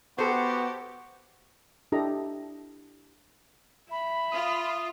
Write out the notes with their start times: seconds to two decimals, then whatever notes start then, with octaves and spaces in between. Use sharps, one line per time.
0.18 B3 F#4 G4 A4 C5
1.92 D4 E4 G4 A4 D#5 A#5
3.91 E5 B5
4.32 F4 D#6